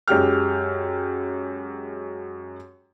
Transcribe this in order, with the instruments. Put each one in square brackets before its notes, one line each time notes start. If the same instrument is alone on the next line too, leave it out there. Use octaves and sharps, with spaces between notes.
[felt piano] F#2 G#3 G4 G5 F6